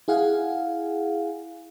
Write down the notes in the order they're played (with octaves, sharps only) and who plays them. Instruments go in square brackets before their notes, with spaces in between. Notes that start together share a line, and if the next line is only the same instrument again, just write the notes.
[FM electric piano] E4 G#4 F5 F#5 G#5